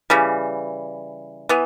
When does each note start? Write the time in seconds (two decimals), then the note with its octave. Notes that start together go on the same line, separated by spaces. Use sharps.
0.10 C#3 E3 G3
1.49 E3 B3